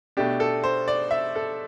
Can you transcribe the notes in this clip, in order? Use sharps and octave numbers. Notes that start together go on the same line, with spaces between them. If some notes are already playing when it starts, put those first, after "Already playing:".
B2 A3 D4 G4
A4
C5
D5
E5
A4